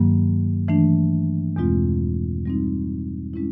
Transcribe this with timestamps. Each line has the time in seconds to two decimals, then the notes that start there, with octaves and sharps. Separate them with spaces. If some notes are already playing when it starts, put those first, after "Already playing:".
Already playing: G2 D#3 F#3 A#3
0.68 E3 A3 D4
1.56 E2 B2 G#3 C4 F4
2.46 G3 C4 D#4
3.34 G#3 C#4 E4